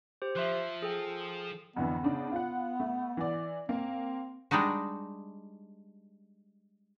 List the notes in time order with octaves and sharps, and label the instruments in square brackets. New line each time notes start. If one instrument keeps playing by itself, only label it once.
[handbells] G4 C5
[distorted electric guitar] F3 [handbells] E5 C6 F#6
[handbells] G#4 A4 G5
[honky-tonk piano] F2 D3 E3 [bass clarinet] B3
[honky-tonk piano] C#3 D4 D#4
F4 F#5
A3
E3 D5
[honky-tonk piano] A#3 [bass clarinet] C4
[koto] G3 G#3 D4 D#4 F#4